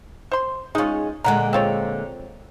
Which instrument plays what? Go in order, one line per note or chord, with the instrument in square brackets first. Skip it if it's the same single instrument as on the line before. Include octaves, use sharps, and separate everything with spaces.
[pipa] C5 C6
[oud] G#3 C#4 [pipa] D#4 F4
[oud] A#2 D3 G#3 [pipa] A#4 F#5
[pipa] C4 F4 C#5